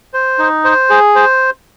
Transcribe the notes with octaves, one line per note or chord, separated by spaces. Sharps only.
C5
D#4
C5
G#4
C5